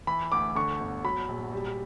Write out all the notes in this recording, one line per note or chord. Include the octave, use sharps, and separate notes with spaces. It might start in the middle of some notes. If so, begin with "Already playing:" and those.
E3 B5
D2 D6
D3 C#6
G1
F#3 B5
A#1
G3